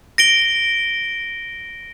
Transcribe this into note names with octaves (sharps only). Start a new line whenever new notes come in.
A#6 D7 G7